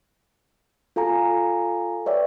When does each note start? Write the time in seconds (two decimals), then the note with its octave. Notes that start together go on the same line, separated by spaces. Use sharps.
0.96 F4 A4 F5 G#5 A#5
2.06 B4 C#5 D5 E5 G5